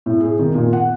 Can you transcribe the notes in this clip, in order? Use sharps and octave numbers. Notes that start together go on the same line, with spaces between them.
A2
G#4
D#3
A#2
F#5